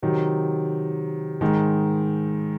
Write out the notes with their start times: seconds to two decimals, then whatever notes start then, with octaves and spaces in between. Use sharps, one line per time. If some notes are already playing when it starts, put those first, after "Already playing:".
0.02 C3 D#3 F#3
1.41 G#2 D#3 G#3